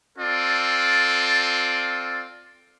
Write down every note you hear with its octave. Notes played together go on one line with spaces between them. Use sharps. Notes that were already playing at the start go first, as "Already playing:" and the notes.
C4 F4 A4 D5